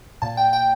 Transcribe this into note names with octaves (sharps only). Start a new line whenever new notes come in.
A#2 A5
G5
G5